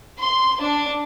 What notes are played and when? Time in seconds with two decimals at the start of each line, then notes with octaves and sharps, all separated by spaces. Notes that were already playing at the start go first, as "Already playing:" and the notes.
0.19 C6
0.61 D4